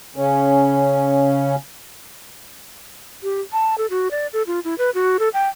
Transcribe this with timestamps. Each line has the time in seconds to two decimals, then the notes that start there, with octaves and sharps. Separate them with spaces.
0.16 C#3 C#4
3.23 G4
3.53 A5
3.78 A4
3.90 F#4
4.11 D5
4.33 A4
4.47 F4
4.64 E4
4.78 B4
4.94 F#4
5.19 A4
5.34 G5